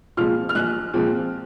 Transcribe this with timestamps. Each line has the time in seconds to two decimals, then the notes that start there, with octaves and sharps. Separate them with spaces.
0.17 A#2 F3 G#3 C4 F6
0.49 F6
0.55 A#1 F#6
0.94 A#2 F3 G#3 C4